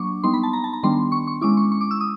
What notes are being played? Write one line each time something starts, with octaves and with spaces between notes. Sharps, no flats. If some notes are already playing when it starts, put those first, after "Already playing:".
Already playing: F#3 A#3 D4 C#6 D6
G3 B3 D#4 C6
B5
A5
A#5
A5
A#5
D#3 G3 B3 D4 C6
C#6
C#6
G#3 C#4 E4 D6
C#6
C#6
D6
E6
D#6